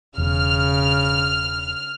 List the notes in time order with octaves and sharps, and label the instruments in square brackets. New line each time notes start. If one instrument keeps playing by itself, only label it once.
[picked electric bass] E1 [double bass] C#3 [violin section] F6